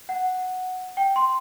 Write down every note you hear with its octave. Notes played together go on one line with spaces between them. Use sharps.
F#5
G5
C6